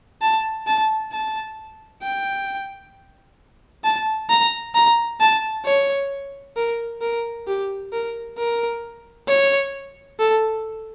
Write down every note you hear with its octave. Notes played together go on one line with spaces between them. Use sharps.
A5
A5
A5
G5
A5
A#5
A#5
A5
C#5
A#4
A#4
G4
A#4
A#4
C#5
A4